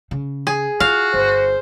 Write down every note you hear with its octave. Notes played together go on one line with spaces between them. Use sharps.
C#3
G#4
F4 F#4 F5
G1 C5